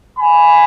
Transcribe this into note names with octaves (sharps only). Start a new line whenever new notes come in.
G#5 B5